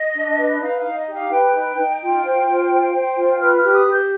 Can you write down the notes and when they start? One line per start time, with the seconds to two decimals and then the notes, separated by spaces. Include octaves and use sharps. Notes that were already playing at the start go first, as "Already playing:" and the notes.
Already playing: D#5
0.15 D4
0.38 B4
0.61 D#4 F5
0.79 F5
0.84 D#4
0.96 D#5
1.08 G4
1.13 F5
1.31 B4 G5
1.55 D#4
1.77 D#4
2.01 F4
2.24 C5
2.47 F4
2.70 C5
2.93 C5
3.16 F4
3.40 B4 F6
3.57 F6
3.63 G4
3.75 D#6
3.86 G4
3.92 G6